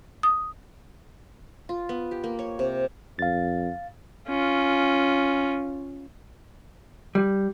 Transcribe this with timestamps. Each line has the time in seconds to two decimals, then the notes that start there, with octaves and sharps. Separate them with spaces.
0.23 D#6
1.69 F4
1.89 B3
2.11 G4
2.24 A#3
2.39 C#5
2.59 C3
3.19 F2 F5 A6
4.28 C#4 F4
7.15 G3